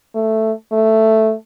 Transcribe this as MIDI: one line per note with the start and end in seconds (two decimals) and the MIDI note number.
0.15 0.52 57
0.72 1.33 57